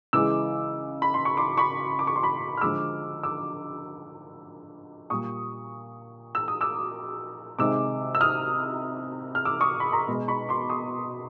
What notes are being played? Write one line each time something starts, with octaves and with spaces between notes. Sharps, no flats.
C#3 E3 G#3 D6 E6
B5
C6
C#6
C6 D6
B5 C#6
D6
C#6
C6
B5 C#6
F6
D3 F3 G#3 D6 E6
D6 E6
A#2 G3 C#6 D#6
E6
D#6
D6 E6
C3 D#3 G#3 D6 E6
E6
D#6 F6
F6
D6 E6
C#6 D#6
B5
A#5 C6
B2 G#3
B5 C#6
C6 D6
C#6 D#6